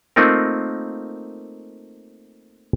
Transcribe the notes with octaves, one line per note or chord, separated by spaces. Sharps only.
A3 A#3 C4 D#4 F4 A#4